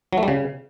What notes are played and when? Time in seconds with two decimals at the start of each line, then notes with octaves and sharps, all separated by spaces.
0.13 F#3
0.18 A3
0.23 G3
0.28 C#3